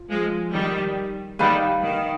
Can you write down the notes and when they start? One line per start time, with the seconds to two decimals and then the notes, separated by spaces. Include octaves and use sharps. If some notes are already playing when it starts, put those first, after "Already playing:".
Already playing: F4
0.09 F3 G#3
0.53 D#3 G3
1.39 D#3 G3 B4 F5 B5
1.84 D#3